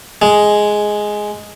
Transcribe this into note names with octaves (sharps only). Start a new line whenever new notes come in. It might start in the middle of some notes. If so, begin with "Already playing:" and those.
G#3